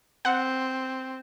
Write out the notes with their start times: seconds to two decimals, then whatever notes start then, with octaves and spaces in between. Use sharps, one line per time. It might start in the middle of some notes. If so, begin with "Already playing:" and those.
0.25 C4 F#5